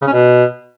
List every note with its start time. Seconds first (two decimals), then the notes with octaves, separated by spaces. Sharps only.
0.02 C#3
0.07 C#4
0.12 B2